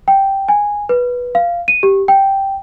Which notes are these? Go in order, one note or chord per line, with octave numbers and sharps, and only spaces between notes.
G5
G#5
B4
F5
D#7
G4
G5